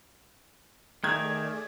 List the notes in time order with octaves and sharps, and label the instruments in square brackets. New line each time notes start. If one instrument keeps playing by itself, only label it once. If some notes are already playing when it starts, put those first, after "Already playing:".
[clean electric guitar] D#3 [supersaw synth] A3 G#4 D5 [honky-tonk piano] G#6